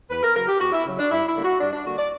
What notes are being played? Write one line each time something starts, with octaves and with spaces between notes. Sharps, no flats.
E2 B4
A#4
C#3 F#3 A#4
G4
E2 F#4
E4
C#3 F#3
D4
G2 E4
E4
D3 G3 A#3 D4
F#4
G2 D4
D4
D3 G3 A#3 D4 F#4
D5